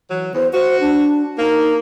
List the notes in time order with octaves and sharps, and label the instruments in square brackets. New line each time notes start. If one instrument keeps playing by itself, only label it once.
[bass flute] E3 [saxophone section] F#3
[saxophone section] E2 [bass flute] C5
[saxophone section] F#4 [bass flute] C5
[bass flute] D4
[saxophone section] A#3 [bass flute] D#4